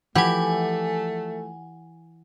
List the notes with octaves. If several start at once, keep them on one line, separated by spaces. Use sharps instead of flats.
E3 F3 A3 E4 G4 F#5 G#5